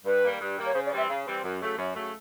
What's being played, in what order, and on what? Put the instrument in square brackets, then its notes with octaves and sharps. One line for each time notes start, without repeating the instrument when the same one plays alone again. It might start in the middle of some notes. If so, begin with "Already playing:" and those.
[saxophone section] G2 [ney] B4
[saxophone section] D#3 G3 A#3
G2
D#3 G3 A#3
[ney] C#5
[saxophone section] C#3 [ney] C5
[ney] D5
[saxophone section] E3 G3 C4 [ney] E5
[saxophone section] C#3 [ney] F5
[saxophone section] E3 G3 C4
F#2
C#3 F#3 A3
F#2
C#3 F#3 A3